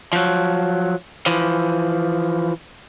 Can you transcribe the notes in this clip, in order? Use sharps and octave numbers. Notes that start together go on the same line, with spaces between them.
F3 F#3
E3 F3